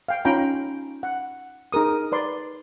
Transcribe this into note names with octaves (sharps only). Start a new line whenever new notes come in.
F5 G5
C#4 D#4 F4 G5 A#5 B5
F#5
D#4 G#4 A#4 D#6
B4 D5 C6